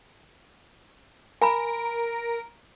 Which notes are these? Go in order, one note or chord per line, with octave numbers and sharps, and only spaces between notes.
A#4 G#5 A#5 B5